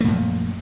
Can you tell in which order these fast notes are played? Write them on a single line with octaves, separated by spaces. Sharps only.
A3 A#2 F#2 F3